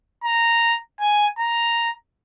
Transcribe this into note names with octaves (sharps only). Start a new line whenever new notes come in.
A#5
G#5
A#5